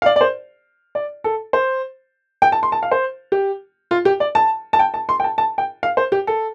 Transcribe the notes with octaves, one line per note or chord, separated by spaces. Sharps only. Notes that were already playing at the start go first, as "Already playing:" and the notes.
F5
D5
D5
C5
D5
A4
C5
G5
A5
C6
A5
F5
C5
G4
F4
G4
D5
A5
A5
G5
A5
C6
G5
A5
A5
G5
F5
C5
G4
A4